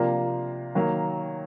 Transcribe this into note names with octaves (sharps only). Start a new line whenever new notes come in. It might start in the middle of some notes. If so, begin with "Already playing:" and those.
Already playing: C3 F3 A#3 D4 F4
D#3 F#3 A#3